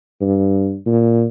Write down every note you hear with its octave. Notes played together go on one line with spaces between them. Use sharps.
G2
A#2